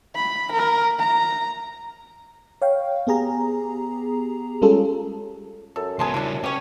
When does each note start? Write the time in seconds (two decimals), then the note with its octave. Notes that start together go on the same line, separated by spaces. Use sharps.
0.16 B5
0.52 A#4
0.99 A#5
2.62 C#5 F5 G5
3.07 B3 G4 G#4 A#5
4.62 G3 G#3 C#4 F4 G#4 A4
5.76 F#2 A4
5.99 C#2 B3 G#4 A5 C6
6.14 C#3 G3 D4 E4
6.44 C#4 G4 C#5